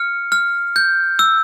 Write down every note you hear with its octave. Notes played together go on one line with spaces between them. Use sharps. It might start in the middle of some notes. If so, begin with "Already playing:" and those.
Already playing: F6 C#7
F6
G6
E6